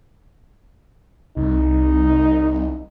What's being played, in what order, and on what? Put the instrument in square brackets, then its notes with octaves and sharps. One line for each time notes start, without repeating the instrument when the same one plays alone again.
[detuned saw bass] C2 [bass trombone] D#4